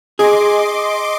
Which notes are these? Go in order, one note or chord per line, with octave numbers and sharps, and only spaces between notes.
G#4 D#5 C6 D6